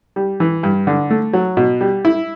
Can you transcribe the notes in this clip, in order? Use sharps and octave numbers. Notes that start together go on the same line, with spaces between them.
G3
E3
G2
D3
A3
F#3
B2
G3
E4